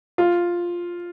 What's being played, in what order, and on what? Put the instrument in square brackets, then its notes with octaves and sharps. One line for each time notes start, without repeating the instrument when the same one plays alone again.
[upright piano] F4